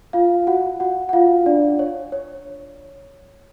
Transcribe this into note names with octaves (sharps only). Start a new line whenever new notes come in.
F4 F5
F#4 F#5
F#4 F#5
F#5
F4 F5
D4 D5
C#5
C#5